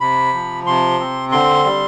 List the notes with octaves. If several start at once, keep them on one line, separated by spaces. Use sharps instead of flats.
C3 B5
F3
C3 C6
C4
D3 C6
G3